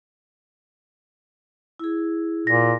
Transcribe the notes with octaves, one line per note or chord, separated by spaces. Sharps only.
E4 G#4
A#2 A#6